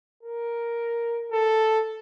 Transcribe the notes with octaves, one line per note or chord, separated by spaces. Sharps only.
A#4
A4